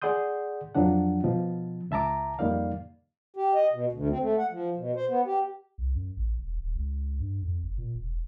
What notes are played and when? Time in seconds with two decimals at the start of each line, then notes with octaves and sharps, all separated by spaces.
0.02 G#4 D5 F#5 C6 D#6 G6
0.75 F2 F3 F#3 D4 F#5
1.24 B2 F3
1.91 C#2 E5 A5 A#5 D6
2.39 F2 G3 A#3 D#4 D5 F5
3.36 G4
3.54 D#5
3.73 B2
3.92 D2
4.10 C4
4.22 A3
4.38 F#5
4.51 F3
4.76 B2
4.96 C5
5.09 B3
5.26 G4
5.78 C2
5.95 F#2
6.17 A1
6.38 E1
6.56 D#1
6.75 C#2
7.20 G2
7.42 F2
7.63 F#1
7.78 A#2
7.94 E1